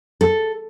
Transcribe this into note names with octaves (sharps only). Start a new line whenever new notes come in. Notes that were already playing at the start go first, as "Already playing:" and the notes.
A4